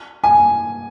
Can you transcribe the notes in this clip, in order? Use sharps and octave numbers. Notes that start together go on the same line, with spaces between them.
G#5